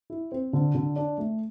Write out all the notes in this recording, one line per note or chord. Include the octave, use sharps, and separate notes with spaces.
E4
C4
D3
D3
D4
A3